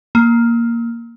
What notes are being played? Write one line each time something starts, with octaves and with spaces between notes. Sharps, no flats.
A#3